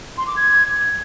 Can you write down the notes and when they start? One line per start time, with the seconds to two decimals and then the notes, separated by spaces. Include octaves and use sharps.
0.18 C6
0.27 D6
0.36 G#6